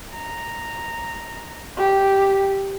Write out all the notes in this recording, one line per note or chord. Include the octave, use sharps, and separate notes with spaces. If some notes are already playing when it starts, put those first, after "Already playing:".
A#5
G4